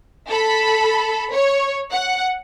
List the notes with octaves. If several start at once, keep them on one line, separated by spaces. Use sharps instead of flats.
A4 B5
C#5
F#5